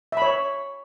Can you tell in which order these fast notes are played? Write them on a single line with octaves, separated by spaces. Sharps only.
E5 B5 C#5